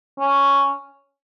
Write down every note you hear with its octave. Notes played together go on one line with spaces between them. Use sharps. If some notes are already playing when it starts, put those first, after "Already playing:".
C#4